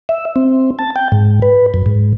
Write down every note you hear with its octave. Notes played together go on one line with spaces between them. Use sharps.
E5
C4
A5
G5
G#2
B4
F#2
G#2